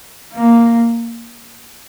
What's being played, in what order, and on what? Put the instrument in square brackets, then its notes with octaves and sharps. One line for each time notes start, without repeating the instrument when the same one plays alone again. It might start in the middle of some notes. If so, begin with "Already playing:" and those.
[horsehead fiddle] A#3